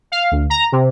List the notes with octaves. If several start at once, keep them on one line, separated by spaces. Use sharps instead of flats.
F5
D2
A#5
C3